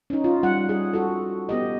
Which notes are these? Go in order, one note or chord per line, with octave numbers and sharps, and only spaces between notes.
C#4 D#4
F4
G3 F#5
G#4
F#4 A4
B3 G4 D#5